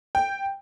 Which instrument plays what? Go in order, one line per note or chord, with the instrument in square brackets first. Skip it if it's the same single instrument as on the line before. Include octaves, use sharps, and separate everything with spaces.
[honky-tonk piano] G5